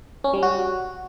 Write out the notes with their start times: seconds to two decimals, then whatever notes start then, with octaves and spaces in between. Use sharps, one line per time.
0.24 C#4
0.33 G3
0.43 F#4